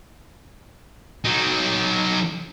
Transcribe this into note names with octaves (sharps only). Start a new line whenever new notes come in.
F#3 D#4